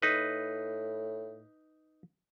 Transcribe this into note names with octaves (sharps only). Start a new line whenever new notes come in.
A2 D#4 B4